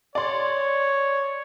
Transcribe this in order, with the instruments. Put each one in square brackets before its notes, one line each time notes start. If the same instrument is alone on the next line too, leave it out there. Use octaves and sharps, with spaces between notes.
[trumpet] C#5 [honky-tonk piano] D5 C6